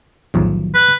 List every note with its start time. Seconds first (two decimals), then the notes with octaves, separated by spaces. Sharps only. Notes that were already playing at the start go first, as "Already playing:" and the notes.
0.34 B1 E2 A2 D#3 F3 F#3
0.74 B4